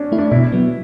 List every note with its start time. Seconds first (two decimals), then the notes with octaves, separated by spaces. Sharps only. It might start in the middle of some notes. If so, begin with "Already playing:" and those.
Already playing: C#4 D4
0.12 A3 E4
0.19 D4
0.31 B2 E4
0.52 F#3 B3